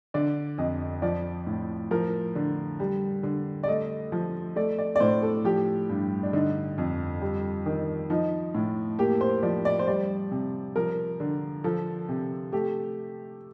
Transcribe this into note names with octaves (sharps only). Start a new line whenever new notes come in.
D3 D5
F2 D#5
F3 D5
A2
F3 A#4
D3
G3
D3
D5
A3 D#5
F3
A3 D5
D5
D5
A2 C5
A4
F3 G4
G2
D4
D3 D#4
F2
G3
D#3
F3 D#4
A2
A#3 G4
C5
F3 D5
D5
C5
G3 D5
C3
F3 A#4
D3
F3 A4
C3
A3 G4